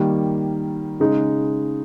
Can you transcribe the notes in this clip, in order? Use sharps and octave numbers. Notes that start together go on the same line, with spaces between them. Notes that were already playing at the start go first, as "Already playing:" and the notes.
Already playing: D#3 G3 A#3
C#3 G#3 D#4